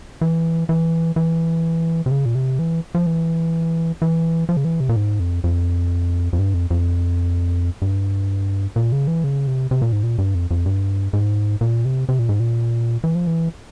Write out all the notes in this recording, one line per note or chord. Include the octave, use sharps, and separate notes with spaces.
E3
E3
E3
C3
C#3
A#2
C3
E3
F3
E3
E3
F3
C#3
E3
C3
A#2
G#2
F2
F2
F2
G2
F2
F2
G2
A#2
C#3
E3
C#3
C3
C3
A#2
G#2
A#2
G2
F2
F2
G2
G#2
A#2
C3
C3
A#2
G#2
A#2
E3
F3
E3